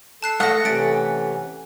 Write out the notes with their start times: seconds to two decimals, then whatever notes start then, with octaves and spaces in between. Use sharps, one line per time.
0.23 A4 A5 F#6 C7
0.40 A3 F#5 D#6 F#6 A#6
0.65 C3 E3 A3 C#4 A6 D7